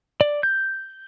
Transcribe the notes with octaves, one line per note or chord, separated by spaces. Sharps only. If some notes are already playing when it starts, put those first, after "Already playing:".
D5
G6